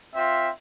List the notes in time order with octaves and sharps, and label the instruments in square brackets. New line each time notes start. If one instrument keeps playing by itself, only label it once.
[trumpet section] C4 F4 E5